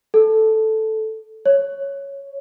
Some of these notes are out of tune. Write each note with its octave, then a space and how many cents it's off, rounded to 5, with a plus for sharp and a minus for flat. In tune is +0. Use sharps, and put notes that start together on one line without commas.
A4 -5
C#5 +0